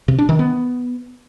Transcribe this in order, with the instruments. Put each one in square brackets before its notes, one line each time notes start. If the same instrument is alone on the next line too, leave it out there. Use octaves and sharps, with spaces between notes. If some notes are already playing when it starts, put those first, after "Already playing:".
[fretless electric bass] C3
D4
D#3
B3